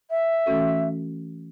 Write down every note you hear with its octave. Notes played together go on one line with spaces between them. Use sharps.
E5
E3 A3 C#4 F#4 A4